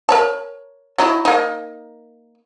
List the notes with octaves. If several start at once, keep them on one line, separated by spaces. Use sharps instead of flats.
A#4 C#5 A5
F#3 D#4 E4
A#3 D#4